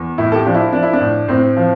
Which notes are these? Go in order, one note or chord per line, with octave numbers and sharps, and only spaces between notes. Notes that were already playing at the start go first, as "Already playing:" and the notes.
Already playing: E2
A2 E4
A4
G4
F3 D4
E4
F3 D4
E4
D4
A2
A2 C4
F3